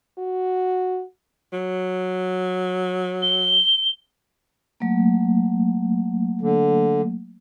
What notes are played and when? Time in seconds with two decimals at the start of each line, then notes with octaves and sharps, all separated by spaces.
0.18 F#4
1.53 F#3
3.22 G7
4.80 F#3 A3 A#3
6.41 D3